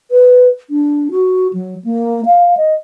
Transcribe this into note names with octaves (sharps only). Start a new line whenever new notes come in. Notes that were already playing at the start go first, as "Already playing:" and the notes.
B4
D4
F#4
F#3
A#3
F5
D#5